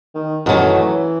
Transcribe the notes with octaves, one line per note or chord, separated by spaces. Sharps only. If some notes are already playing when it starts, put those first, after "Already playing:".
D#3
F#2 D#3 E3 F#3 A3